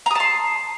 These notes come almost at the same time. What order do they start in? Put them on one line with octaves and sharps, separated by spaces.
A#5 D#6 A5 C6